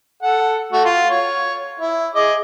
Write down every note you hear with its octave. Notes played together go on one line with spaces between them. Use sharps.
A4 F#5
A3 F#4
F4
C#5
E4
G#4 D#5 D6